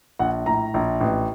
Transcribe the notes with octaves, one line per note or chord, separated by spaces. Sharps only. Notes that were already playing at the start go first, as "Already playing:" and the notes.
A#1 F#5
A2 A#5
A#1
A1